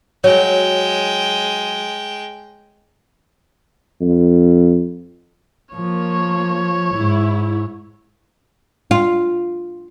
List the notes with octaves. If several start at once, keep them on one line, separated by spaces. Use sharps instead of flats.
F#3 G#3 C#5 G5
F2
F3 A#3 C#5
G#2 E4
F4